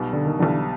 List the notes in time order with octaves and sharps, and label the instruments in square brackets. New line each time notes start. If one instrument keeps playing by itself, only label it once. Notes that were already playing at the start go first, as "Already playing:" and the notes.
Already playing: [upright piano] B1 B2 G3
[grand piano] D3
D#3
[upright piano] B1 B2 G3 [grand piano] D3 E3